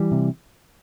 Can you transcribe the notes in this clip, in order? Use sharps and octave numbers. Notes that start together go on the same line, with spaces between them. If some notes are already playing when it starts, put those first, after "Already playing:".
Already playing: E3 G3
C3